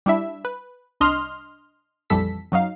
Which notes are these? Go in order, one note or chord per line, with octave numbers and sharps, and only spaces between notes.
G3 D4 E4 E5
B4
C2 D4 D#5 C6 F6 C7
A#1 F2 E3 G3 A4 B6
F#2 F#3 D#4 F5